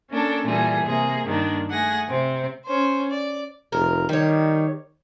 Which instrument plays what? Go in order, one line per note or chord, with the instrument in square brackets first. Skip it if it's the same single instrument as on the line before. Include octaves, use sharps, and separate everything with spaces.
[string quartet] A#3 C#4 D4 A4
A#2 E3 G3 A#3 G#4 A4
C3 A#3 G#4
G2 D#3 A#3 D4
A3 G#4 F#5 G#5 A#6
C3 C4
[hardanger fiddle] C#4 C5
D5
[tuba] F1 [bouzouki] A#4
[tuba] D#3 [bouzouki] G3 C#5